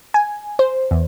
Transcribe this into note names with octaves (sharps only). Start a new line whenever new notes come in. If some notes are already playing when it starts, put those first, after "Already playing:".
G#5
C5
E2